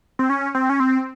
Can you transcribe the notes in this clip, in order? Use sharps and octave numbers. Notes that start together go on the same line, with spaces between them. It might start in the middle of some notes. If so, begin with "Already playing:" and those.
C4
C#4
C4
C#4
C4